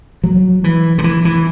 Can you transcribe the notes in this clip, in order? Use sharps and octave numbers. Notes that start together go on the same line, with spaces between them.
F#3
E3
D3
E3
E3